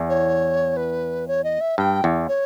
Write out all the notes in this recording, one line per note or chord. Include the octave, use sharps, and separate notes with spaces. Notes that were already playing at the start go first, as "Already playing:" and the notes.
Already playing: E2
C#5
B4
C#5
D#5
E5
G2 G5
E2
C#5